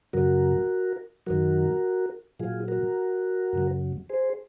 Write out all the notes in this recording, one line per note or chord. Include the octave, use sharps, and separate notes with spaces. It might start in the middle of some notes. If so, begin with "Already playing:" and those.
F#2 C#3 F#3 F#4 A#4
F#2 D#3 F#3 F#4 A#4
A#2 F#3 F4 G#4
F#4 A#4
F#2 C#3 F#3
G#4 C5